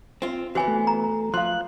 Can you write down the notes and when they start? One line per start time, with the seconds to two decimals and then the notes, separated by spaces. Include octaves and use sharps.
0.22 C4 F4
0.55 E3 B3 F#4 C#5 G#5
0.68 A3
0.87 A#5
1.34 F3 F5 C6 F#6